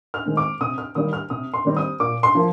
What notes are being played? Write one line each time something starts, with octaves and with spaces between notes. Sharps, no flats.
F6
D#3 G#3 C4
D6
C3 D#6
F6
D#3 G3 A#3 D#6
F6
C3 D#6
C6
D#3 G3 C4
D#6
A#2 D6
C6
F3 A#3